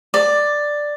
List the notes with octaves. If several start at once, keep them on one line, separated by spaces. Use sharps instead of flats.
D5